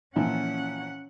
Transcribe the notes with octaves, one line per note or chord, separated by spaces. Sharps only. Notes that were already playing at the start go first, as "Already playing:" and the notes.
A#2 E3 F3 C#4 F#5